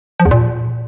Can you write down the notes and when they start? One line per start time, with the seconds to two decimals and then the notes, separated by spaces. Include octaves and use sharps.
0.20 F3
0.25 E2
0.31 A#2